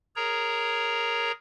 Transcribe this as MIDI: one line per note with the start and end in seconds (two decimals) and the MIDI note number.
0.16 1.32 68
0.16 1.32 70
0.16 1.32 73
0.16 1.32 82